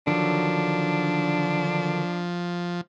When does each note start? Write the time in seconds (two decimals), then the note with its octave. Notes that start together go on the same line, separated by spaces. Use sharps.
0.07 D3 D#3 F3 F#3 D4